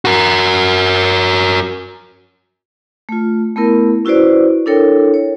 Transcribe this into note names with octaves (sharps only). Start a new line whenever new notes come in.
F#4 A#4
A3 F4
A3 B3 E4 A#4
C#4 E4 F#4 B4 C5 D5
D4 E4 A4 A#4 C#5 G5
C#5